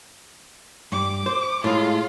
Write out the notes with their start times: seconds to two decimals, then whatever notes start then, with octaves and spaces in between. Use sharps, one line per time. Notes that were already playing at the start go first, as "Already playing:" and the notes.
0.92 G2 D6
1.26 C5
1.64 A2 G#3 F4